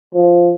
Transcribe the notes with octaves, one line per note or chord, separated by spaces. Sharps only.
F3